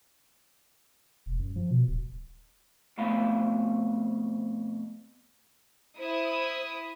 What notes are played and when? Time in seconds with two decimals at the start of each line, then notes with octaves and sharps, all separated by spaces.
1.26 E1
1.39 F#2
1.56 F3
1.70 B2
1.88 D1
2.98 F2 B2 A3 F5 B5
5.98 E4 C5 D#6